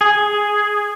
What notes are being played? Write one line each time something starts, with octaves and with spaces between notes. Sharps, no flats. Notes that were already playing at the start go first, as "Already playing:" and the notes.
G#4